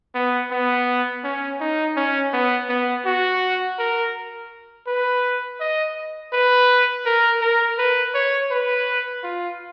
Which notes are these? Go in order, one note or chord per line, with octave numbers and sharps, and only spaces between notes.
B3
B3
C#4
D#4
C#4
B3
B3
F#4
A#4
B4
D#5
B4
A#4
A#4
B4
C#5
B4
F4